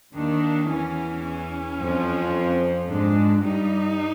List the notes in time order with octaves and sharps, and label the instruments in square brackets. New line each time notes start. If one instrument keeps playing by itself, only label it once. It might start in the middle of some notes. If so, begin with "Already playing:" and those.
[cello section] D#2 D#3 [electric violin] D4
[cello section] E2 E3 [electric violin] C#4
[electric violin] C#4
[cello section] F2 F3
[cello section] G#2 G#3 [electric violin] D4
[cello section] G2 G3 [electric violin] D#4